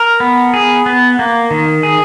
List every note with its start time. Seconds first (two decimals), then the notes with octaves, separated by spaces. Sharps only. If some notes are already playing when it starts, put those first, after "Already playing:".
Already playing: A#4
0.20 B3
0.54 G#4
0.86 B3
1.19 A#3
1.51 D#3
1.83 G#4